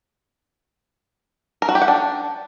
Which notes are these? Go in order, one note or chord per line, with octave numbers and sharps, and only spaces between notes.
A#4
F#4
G4
F#5
D4